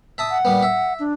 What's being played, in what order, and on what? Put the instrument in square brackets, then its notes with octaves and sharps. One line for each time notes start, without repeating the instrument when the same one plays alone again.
[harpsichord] E5 A5 D#6
[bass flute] F#5
[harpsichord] A#2 G3 B3
E5
[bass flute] D4